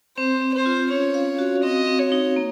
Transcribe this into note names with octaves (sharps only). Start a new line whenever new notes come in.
C4 C5
C4
C5
F4
C#4 C#5
F5
F#4
C4 D#5
C4
C#5
D#4
A#3